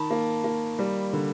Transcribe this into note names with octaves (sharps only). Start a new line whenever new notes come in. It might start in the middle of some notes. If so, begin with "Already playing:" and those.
Already playing: D#3 A5 B5
A#3
A#3
G3
D3